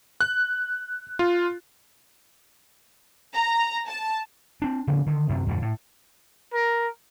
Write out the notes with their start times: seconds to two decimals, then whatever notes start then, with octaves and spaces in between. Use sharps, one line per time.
0.21 F#6
1.19 F4
3.34 A#5
3.88 A5
4.62 C4 D4
4.88 C#3 F3 A#3 B3
5.06 D3 D#3
5.29 F#2 C3
5.47 F2 G#2 B2 D3
5.62 A2
6.53 A#4